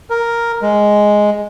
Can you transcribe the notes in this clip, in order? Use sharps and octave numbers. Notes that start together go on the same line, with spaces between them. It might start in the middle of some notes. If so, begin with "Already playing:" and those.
A#4
G#3